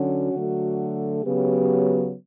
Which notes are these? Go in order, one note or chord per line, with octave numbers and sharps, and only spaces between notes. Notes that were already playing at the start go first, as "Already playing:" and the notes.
Already playing: D3 F#3 C#4 F#4
D3 F#3 A3
C#3 F#3 B3 G4